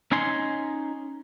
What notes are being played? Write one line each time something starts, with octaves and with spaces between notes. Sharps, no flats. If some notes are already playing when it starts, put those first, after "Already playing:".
C#4 D#4 G#5 C6